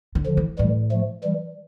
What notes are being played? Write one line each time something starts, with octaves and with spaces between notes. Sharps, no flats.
D3
D3 F3
E3
A2 E3 G3
F3 A3
E3 G3